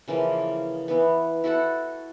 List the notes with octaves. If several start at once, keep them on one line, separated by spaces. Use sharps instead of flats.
C#3 E3 F3 A#3
E3 B3
E4 F#4 A4 F#5